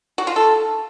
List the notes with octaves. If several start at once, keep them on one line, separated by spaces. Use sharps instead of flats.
F#4
F4
A4